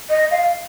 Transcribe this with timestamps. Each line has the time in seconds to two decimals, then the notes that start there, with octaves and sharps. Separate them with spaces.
0.10 D#5
0.31 F5